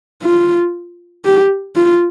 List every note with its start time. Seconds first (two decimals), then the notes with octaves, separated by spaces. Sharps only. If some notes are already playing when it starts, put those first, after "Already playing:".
0.23 F4
1.25 G4
1.76 F4